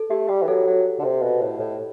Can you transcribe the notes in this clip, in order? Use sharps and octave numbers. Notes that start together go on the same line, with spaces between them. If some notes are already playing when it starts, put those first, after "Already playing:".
Already playing: A4
A3 G4
G3 G4
E3
F#3 A4
F#3
D3
C3
B2
A2
A2